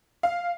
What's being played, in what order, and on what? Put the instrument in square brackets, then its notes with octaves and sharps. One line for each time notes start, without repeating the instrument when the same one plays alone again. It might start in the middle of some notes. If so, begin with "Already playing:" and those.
[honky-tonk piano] F5